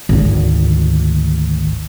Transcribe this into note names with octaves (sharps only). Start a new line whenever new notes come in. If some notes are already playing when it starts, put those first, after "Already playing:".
G#1 D2